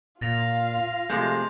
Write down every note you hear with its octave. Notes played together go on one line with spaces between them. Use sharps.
A#2 F4 F5 A6 A#6 F7
C3 F3 G#3 A3 G6